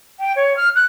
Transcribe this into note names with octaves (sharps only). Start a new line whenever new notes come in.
G5
C#5
F6
F#6